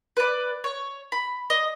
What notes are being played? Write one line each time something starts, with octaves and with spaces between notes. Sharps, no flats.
B4 D5
C#5
B5
D#5